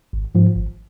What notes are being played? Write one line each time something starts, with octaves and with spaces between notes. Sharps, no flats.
G#1
G#2 F3
G#1